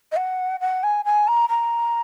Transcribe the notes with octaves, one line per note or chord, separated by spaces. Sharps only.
D#5
F#5
F#5
G#5
G#5
A#5
A#5